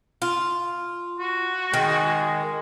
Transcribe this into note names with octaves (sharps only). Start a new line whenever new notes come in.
F4
F#4
D#3 G#3